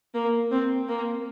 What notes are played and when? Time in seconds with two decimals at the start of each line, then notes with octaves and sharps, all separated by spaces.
0.14 A#3
0.51 C4
0.88 A#3